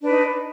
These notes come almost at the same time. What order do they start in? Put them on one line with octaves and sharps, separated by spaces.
D4 B4 D#4